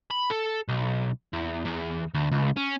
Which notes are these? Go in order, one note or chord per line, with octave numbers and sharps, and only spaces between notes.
B5
A4
B1
E2
E2
D2
C#2
C#4